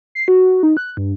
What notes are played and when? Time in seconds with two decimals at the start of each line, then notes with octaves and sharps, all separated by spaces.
0.15 C7
0.28 F#4
0.63 D#4
0.77 F#6
0.97 G2